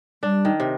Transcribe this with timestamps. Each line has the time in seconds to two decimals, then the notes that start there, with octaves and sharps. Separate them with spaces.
0.23 G3 D4
0.45 D#3
0.60 C3